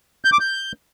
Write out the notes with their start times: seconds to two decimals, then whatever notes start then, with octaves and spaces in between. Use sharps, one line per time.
0.25 G6
0.32 D6
0.40 G6